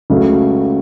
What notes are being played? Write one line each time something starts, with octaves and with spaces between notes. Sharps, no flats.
C#2 C#3 F#3 A3